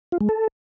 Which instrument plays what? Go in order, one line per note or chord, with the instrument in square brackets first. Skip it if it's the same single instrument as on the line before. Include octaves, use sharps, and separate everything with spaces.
[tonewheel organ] F4
G#3
A4